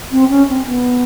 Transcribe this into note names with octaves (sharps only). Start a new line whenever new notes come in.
C4
C#4
C4
B3